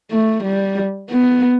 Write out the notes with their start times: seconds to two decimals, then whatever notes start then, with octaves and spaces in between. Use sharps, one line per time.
0.11 A3
0.44 G3
1.11 B3